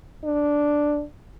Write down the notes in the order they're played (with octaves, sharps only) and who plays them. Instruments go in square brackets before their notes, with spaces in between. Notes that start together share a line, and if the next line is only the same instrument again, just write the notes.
[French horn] D4